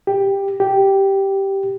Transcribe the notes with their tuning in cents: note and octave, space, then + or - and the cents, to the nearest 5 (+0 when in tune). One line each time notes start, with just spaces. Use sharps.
G4 +10
G4 -5